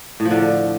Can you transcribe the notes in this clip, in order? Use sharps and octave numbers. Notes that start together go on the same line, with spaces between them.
A2
F3
D3